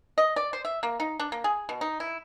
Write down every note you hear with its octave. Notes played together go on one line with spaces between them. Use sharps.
D#5
D5
C5
E5
A#3
D#4
D4
A#3
G#4
B2
D#4
E4